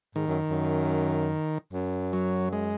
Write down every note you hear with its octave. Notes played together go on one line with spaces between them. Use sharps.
G#2 D#3
F#2
F#2
F#2
F#3
G#3